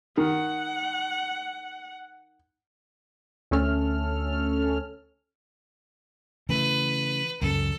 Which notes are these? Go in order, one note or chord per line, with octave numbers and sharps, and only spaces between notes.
D#3 F#5
D2 A3 C#4 A4 F6
C#3 E3 A3 B4
C#2 F#2 C#3 A4